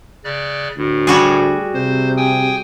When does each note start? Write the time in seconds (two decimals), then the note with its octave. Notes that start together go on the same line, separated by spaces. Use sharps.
0.24 C#3 D5 F#6
0.77 D2 A2
1.07 G3 F#4 G#4
1.74 C3 C5
2.17 G5 G#5 D#6